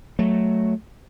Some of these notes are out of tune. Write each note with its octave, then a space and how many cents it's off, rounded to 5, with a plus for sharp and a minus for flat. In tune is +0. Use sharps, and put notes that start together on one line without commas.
F#3 +0 A3 +0